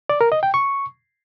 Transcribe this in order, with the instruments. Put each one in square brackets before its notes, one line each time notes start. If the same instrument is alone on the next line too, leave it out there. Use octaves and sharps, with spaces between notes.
[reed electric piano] D5
A#4
D#5
G5
C#6